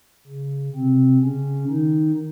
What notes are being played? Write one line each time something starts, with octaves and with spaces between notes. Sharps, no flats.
C#3
C3 C4
C#3 C#4
D#3 D#4